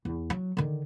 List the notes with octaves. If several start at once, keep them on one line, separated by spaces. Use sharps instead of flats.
E2
F#3
D3 D#3